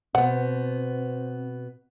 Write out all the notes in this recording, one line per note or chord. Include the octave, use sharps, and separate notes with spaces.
B2 B3 C4 C5 F#5